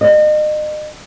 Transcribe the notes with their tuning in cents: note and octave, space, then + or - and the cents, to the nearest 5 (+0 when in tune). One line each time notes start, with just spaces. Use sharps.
D#5 -35